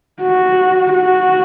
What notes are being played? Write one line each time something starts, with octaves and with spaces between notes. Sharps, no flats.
F#4
F#4